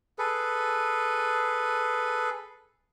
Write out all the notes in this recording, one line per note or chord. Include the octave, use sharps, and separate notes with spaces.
G#4 A4 B4